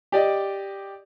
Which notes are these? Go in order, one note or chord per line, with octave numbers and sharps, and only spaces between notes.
G4 D5 D#5